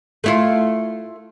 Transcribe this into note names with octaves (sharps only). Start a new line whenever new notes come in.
A3 E4 F4